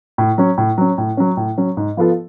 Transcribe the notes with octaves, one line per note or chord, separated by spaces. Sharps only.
A2
F#3 C#4
A2
F#3 C#4
A2
F#3 C#4
A2
F#3 C#4
G#2
F3 B3 F4 A4